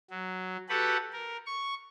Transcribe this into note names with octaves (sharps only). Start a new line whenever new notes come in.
F#3
F#4 G4 A4 B4 F#5
A#4
C#6